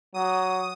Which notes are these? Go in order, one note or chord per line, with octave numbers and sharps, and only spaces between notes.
F#3 D#6